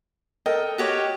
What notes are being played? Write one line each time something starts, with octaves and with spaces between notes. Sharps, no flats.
A4 A#4 D#5 G5
F#4 G4 C#5